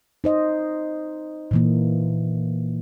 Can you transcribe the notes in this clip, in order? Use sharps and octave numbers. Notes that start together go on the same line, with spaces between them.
D#4 C5 D#5
A#2 E3 A#3